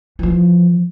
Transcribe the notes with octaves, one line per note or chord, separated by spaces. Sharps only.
E3 F3